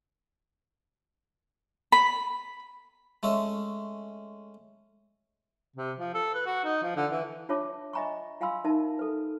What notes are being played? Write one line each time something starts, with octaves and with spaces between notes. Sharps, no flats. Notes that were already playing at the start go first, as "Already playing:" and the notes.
B5
G#3 A3 C#4 E5
C3
F3
A4
B4
F#4
D#4
F3
D3
E3
D4 F4 C#5 E5 A5 D6
D#5 E5 G#5 A#5 B5 C#6
F4 F5 G#5 B5 C6 E6
D#4 A#4 E5 A5
A4 B4